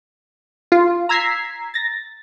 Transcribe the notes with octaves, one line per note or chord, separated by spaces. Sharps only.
F4
A#5 E6 G#6 B6 C7
A6 A#6